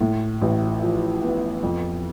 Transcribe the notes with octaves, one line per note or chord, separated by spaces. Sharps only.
A2
A1
F3
B3
F2